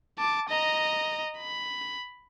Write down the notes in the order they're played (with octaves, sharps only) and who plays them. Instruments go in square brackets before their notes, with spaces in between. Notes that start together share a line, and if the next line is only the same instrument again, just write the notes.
[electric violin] A5 D6
D#5 A#5
B5